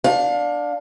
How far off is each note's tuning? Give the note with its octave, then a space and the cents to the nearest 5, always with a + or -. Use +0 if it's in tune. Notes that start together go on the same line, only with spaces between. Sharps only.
D4 +0 F5 +30